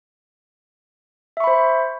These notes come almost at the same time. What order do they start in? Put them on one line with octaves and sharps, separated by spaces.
E5 C#6 B5 C5